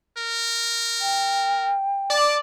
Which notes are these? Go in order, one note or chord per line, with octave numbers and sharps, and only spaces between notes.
A#4
G5
D5 A5